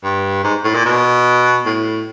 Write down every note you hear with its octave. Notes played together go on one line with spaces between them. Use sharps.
G2
G#2
A2
A#2
B2
A2